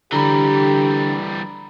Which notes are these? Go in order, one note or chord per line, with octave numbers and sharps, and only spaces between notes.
D3 E3 G3 G4 A#5 B5